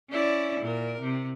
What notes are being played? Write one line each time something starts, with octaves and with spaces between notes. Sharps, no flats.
C#4 E4 D5
A#2 A#4
C3